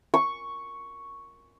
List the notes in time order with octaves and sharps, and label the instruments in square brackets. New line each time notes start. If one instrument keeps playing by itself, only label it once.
[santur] C#6